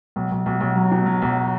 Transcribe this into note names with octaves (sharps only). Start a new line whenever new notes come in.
B1
B1
B1
B1
F#3
B2
F#3
B1